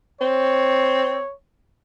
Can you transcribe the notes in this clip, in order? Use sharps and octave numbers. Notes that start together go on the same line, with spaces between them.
C4 C#5